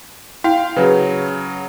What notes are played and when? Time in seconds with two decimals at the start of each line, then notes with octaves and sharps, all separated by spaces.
0.44 E4 F5 G5
0.76 C#3 F#3 G#4 B4